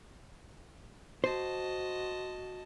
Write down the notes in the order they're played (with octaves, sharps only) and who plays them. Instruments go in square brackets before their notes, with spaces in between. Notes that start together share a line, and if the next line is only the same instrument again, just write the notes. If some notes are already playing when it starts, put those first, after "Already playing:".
[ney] F#4 [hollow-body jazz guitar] C5 [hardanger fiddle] D#5 A5